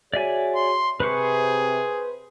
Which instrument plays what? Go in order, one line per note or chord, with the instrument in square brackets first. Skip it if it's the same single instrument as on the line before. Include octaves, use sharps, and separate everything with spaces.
[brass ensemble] F#4 G#4 C#5 [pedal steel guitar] D5 E5 G#5
[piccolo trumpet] C6
[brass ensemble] C3 [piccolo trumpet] G#4 [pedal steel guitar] B4 C5 C#6